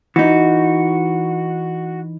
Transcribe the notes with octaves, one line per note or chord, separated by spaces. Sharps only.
E3 D#4 F#4